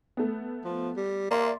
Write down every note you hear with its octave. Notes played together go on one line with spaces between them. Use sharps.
A3 B3
F3
G3
A#3 D5 E5 C6